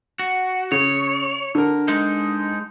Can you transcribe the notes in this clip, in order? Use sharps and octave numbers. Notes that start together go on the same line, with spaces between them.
F#4
C#3 C#5
D3 A#4
G#3 D#4